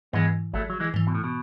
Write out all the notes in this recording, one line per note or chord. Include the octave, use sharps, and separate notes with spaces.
G#2 E3 G#3 B3
G#1 F#3 A3
F#3
E3 G#3
G#2 E3
B2
A2
B2